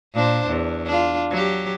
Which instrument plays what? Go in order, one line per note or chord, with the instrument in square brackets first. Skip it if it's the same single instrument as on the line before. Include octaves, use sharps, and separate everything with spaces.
[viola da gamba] A#2 D4 C5
E2
D4 F4
F#3 G4